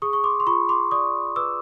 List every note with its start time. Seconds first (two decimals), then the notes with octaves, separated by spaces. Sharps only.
0.02 G#4 C#6 D#6
0.13 C#6
0.24 C6 D6
0.40 C6
0.47 F4 B5 C#6
0.69 C6 D6
0.91 D5 C#6 D#6
1.36 B4 D6 E6